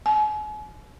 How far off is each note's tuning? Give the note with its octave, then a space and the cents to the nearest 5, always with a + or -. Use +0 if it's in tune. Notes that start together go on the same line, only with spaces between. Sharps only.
G#5 +45